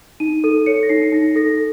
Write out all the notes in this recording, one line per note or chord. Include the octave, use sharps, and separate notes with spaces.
D#4 D#7
A4 D#7
C#5 C#7
A#6
D#4 C7
D#4 A#6
A4 A#6